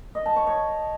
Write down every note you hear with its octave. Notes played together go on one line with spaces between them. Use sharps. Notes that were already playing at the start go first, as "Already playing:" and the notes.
D#5
A5
C#5
C#5